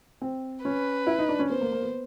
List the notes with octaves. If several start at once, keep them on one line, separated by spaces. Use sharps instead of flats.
C4
C#4 B4
E4
D#4
D4
C#4
B3 C5
A#3
A#3
B3